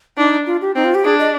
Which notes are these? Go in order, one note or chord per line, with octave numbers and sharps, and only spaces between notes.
D4 D#4
F4
G4
C4 D#4
F4
G4
D4 G#4
D#5